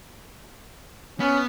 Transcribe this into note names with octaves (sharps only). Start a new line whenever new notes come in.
B3 C#4